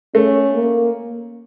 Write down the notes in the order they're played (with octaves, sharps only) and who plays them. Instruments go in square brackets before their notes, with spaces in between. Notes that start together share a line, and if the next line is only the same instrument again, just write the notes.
[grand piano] A3 [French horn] C#4
[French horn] A#3